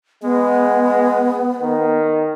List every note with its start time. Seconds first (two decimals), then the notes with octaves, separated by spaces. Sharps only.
0.23 G#3 B3
1.61 D#3